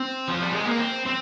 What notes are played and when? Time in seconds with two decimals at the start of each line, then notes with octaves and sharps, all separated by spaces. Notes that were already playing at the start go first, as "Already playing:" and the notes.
Already playing: C4
0.28 F3
0.41 G3
0.52 G#3
0.65 A#3
0.77 C4
1.05 C4